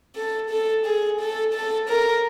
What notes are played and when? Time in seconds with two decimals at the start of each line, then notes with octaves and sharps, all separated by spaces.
0.15 A4
0.50 A4
0.86 G#4
1.20 A4
1.54 A4
1.89 A#4